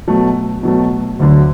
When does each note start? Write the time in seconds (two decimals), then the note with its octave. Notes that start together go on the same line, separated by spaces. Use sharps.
0.08 B2 F#3 A3
0.63 B2 F#3 A3
1.19 D2 D3 F#3